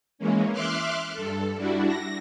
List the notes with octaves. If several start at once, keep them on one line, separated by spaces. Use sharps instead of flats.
E3 G#3 A#3 C#4
E5 C6 D6 F6 F#6
G2 A4
G3 D4 E4 F#4
A#6